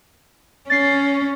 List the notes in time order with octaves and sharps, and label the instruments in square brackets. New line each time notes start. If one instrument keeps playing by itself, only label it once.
[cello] C#4 [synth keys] A6 C7